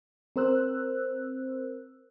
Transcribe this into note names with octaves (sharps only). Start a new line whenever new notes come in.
C4 A#4 C5 E6 F#6